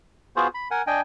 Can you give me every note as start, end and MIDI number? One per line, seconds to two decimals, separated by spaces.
0.36 0.47 59
0.36 0.47 65
0.36 0.47 66
0.36 0.47 68
0.36 0.47 72
0.54 0.68 83
0.71 0.82 70
0.71 0.82 78
0.71 0.82 80
0.87 1.01 62
0.87 1.01 75
0.87 1.01 79
0.87 1.01 80